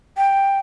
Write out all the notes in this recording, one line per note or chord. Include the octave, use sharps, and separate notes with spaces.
G5